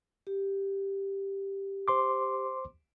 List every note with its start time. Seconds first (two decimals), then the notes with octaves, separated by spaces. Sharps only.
0.27 G4
1.88 C5 C6 D6